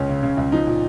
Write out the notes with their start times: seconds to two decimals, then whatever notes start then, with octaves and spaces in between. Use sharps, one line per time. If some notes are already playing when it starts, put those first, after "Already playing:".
Already playing: C#2 C#4
0.09 C#3
0.23 C#3
0.37 C#2
0.52 F3 D#4
0.67 A#2